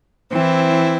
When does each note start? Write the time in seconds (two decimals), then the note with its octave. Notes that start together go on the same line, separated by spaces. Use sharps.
0.32 E3 C4 E4